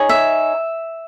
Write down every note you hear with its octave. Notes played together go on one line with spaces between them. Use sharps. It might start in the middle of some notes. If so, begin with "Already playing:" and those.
Already playing: D#4 G#4 C#5
E5